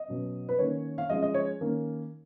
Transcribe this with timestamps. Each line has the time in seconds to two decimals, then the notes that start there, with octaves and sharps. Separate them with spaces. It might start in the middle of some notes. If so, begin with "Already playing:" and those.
Already playing: D#5
0.08 B2 F#3 C#4
0.49 B4
0.59 D#3 A#3 C#4 C#5
0.98 F5
1.10 F3 G#3 C#4 D#5
1.23 D#5
1.34 C#5
1.61 D#3 A#3 C#4